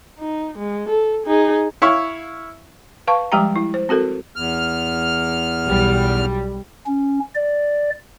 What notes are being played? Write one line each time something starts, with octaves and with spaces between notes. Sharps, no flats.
D#4
G#3
A4
D#4 G#4
E4 C#5 F5
B4 F5 A5 C#6
F3 G3 G#3 G4 G5 A#5
E4
C5
C4 F#4 A4 A#4
E2 F6
B1 G3
C#4
D5